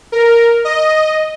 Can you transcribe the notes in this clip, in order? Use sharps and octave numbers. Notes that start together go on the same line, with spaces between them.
A#4
D#5